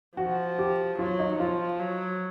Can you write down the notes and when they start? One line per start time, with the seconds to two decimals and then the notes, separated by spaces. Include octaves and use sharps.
0.17 F3 F#4
0.59 G4
0.99 F#3 F4
1.19 D#4
1.39 F3 F4
1.80 F#3